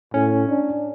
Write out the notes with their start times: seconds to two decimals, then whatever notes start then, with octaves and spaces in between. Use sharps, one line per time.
0.14 A2 C#4
0.49 D4